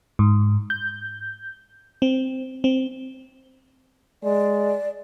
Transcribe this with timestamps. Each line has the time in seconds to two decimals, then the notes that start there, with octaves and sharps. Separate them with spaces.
0.19 G#2
0.70 G6
2.02 C4
2.64 C4
4.23 G#3 D5